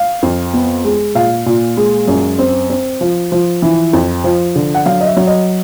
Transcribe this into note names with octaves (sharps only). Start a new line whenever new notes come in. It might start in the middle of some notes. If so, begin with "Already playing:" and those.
Already playing: F5
F2
B3
G#3
A#2 F5
A#2
G#3
F#2
C4
C4
F3
F3
E3
F2
F3
D3
F#5
F#3 F5
D#5
E5
F#3
D#5